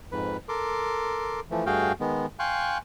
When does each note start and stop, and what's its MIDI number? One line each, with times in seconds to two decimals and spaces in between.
0.12 0.37 41
0.12 0.37 44
0.12 0.37 71
0.49 1.40 69
0.49 1.40 70
0.49 1.40 84
0.49 1.40 86
1.51 1.65 52
1.51 1.65 53
1.51 1.65 57
1.66 1.92 43
1.66 1.92 57
1.66 1.92 66
1.66 1.92 68
1.66 1.92 77
1.66 1.92 79
2.00 2.26 51
2.00 2.26 56
2.00 2.26 59
2.39 2.78 77
2.39 2.78 79
2.39 2.78 80
2.39 2.78 84
2.39 2.78 85
2.39 2.78 90